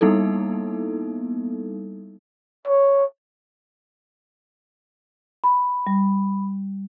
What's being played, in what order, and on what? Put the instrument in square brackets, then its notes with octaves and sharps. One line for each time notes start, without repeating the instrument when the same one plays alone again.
[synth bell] G3 A#3 B3 D#4 E4 A4
[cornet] C#5
[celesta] B5
[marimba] G3